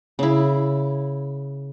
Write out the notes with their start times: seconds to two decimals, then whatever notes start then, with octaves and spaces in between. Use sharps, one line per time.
0.19 C#3 E4